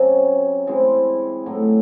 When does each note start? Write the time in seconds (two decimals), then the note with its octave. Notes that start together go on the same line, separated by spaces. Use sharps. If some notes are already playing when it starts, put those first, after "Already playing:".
Already playing: C3 F#3 C#4
0.67 E3 G#3 C4 E4
1.46 A2 F#3 A3 D#4